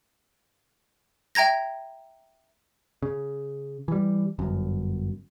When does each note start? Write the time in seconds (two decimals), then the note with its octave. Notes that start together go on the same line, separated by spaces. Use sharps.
1.35 E5 G5 A#5 G#6 A#6
3.03 C#3
3.88 E3 G3
4.39 G1 F#2